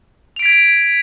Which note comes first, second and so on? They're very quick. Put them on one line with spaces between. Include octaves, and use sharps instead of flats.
F7 D7 B6 G#6